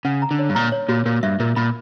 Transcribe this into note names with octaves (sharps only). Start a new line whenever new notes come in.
C#3 F#5
A#5
D3
C#5
G2
A#2 A#5
C#5
A#2 F#4
A#2 A#4
G2 E5
A#2 A#4
A#2 B5